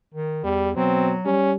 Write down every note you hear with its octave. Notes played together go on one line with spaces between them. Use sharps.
D#3
E2 G3
B2 F#3 C4
G3 C#4